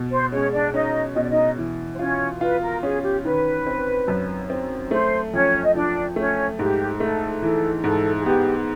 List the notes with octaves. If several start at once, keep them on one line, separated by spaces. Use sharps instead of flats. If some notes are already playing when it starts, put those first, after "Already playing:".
Already playing: B2
C5
G#3 C#4 C#5
D4 D5
C#4 D#4 D#5
B2 D#5
D5
D#4 D#5
E3
C5
C#4 F4 C#5
F4 B4
A#4
C#4 G#4
G4
D#3 B4
C4
F#2
C4
A3 C5
F2 C#4 C#5
D#5
F3 D4 D5
A3 C#4 C#5
G#2 G4
A3 A4
E3 A4
G#2 A4
G#4
B3 G4